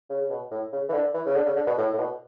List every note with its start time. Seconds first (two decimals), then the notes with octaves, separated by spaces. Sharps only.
0.10 C#3
0.21 C#3
0.30 B2
0.51 A2
0.73 C#3
0.89 E3
0.93 D3
1.14 E3
1.26 C#3
1.35 D3
1.46 C#3
1.56 D3
1.67 B2
1.78 A2
1.93 A2
1.98 B2